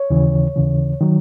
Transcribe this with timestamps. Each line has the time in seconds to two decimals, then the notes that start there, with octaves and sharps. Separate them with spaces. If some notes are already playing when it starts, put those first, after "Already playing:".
Already playing: C#5
0.10 D#2 C#3 E3
0.56 D#2 C#3 E3
1.01 D#3 F#3